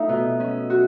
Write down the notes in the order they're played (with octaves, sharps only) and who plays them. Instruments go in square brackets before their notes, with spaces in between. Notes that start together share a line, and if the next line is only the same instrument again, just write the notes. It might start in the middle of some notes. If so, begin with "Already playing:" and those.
Already playing: [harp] A3 D#4 [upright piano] E5
[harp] B2
C#4
F#4